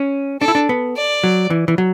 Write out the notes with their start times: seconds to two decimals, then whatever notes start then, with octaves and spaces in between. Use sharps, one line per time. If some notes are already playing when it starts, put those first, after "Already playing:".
Already playing: C#4
0.41 D4 A4
0.48 E4
0.55 D4
0.69 B3
0.96 D5
1.23 F#3
1.50 E3
1.68 E3
1.78 F#3